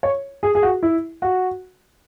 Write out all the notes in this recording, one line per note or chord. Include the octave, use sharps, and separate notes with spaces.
C#5
G#4
G#4
F#4
E4
F#4